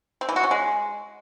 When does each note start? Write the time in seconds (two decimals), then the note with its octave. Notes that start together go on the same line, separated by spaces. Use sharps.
0.21 C4
0.29 E3
0.36 F#4
0.44 C#4
0.51 G#3